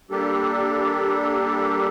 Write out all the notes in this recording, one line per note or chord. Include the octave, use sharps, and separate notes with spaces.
G3 A#3 D4 G4 A4